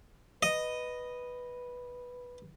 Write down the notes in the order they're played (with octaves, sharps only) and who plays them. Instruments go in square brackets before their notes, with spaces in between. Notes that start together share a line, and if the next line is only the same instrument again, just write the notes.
[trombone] B4 [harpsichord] D#5